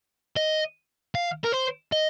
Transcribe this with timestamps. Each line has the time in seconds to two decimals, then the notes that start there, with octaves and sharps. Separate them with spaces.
0.37 D#5
1.15 F5
1.44 A#4
1.53 C5
1.92 D#5